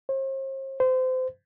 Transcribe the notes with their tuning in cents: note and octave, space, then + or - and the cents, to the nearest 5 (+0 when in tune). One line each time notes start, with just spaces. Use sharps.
C5 +45
C5 -25